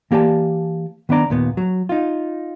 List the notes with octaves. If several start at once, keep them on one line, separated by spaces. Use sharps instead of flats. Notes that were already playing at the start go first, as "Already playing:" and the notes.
E3 A#3 G4 D5 A5
D#3 B3 D4 D5 A#5
D#2 A#2 B3
F#3
D#4 F4